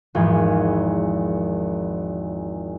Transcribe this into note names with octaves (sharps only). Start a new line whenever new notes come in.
G#1 E2 F3 G#5